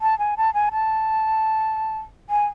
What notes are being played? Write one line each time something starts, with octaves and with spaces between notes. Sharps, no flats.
A5
G#5
A5
G#5
A5
G#5